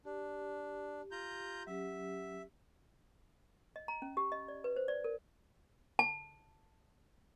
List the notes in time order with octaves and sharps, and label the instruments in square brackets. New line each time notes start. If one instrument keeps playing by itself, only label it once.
[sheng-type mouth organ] D4 [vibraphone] G4
[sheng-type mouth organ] F4 A#5 G6
[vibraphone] F#3 C#4 G4 [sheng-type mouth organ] E5
[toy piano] D#5
A#5
C#4
G4
D#5
D5
B4
C5
D5
A#4
A5